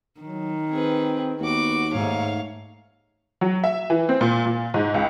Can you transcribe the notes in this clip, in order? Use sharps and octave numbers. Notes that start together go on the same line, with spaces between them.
D#3 F#3
C4 G#4 B4
D#2 B3 F#4 D6
G#2 A3 C#5 F5
F#3
E5
E3
C4
A#2
A#2
G#2
C#2